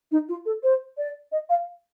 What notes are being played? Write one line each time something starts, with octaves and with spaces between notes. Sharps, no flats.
D#4
F4
A4
C5
D5
D#5
F5